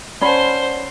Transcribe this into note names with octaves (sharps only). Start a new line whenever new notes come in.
C#4 C5 D5 F#5 A5 B5 C6